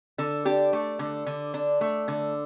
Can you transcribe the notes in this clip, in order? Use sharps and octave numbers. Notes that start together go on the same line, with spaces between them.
D3 A4
D4 G4
A3
D3
D3
D4
A3
D3